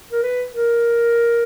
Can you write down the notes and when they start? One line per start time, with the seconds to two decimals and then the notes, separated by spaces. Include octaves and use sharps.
0.11 A#4
0.23 B4
0.53 A#4